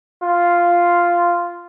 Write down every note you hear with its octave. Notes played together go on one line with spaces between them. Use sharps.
F4